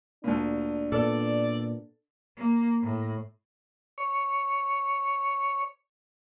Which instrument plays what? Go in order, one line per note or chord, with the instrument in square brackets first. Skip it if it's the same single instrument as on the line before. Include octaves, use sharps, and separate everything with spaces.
[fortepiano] D2 A#2 [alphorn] D4
[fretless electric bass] A#2 B3 [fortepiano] A4 [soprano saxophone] D5
[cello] A#3
A2
[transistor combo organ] C#5 C#6